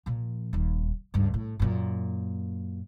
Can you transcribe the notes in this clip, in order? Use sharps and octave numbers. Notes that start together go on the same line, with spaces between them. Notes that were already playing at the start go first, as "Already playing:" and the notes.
A#2 F3
D#1 D#2
C#2 G2
A2
F#2 A#2